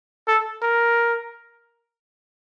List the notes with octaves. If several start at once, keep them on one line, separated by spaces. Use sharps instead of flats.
A4
A#4